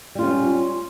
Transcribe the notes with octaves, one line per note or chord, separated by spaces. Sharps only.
G3 C#4 F4